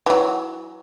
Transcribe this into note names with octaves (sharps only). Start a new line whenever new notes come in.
E3 F#3